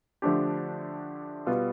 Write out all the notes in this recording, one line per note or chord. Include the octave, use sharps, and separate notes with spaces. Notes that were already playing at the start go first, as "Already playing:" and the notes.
D3 F3 A3 D4 G4
B2 G3 B3 F4